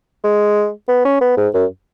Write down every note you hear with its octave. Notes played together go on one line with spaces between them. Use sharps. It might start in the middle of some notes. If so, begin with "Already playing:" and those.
G#3
B3
C#4
B3
G#2
F#2